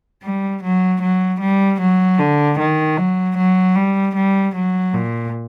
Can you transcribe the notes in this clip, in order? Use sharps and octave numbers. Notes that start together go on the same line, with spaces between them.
G3
F#3
F#3
G3
F#3
D3
D#3
F#3
F#3
G3
G3
F#3
A#2